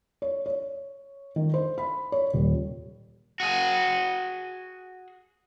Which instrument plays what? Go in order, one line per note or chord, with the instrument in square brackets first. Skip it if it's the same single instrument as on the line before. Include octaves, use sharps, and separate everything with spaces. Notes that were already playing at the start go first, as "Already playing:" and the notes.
[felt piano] C#5
C#5
D#3
C5
B5
C#5
D#1
[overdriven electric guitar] F#4 G#4